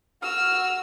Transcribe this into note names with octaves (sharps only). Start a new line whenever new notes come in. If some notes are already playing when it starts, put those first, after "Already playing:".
F#4 E6 F6